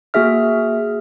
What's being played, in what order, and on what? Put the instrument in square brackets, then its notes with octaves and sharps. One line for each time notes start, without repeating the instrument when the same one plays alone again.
[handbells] A#3 F#4 G#4 E5 F6